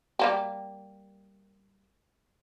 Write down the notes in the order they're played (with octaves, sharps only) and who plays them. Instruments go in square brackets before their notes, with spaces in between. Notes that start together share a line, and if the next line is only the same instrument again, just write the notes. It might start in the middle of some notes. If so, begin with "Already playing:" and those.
[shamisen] G3 A#3 G4